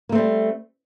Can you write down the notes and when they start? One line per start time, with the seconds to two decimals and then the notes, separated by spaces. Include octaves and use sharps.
0.09 A#3
0.12 A3
0.15 C4
0.18 G3